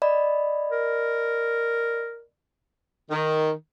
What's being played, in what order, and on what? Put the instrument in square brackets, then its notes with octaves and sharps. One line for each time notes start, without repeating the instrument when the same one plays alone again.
[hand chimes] D5 D#5 B5
[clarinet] A#4
[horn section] D#3